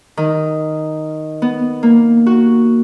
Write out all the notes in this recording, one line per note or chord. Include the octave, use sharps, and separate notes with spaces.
D#3
B3
A#3
F#4